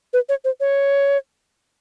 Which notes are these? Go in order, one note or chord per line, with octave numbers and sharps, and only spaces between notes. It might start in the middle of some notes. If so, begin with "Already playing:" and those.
B4
C#5
C5
C#5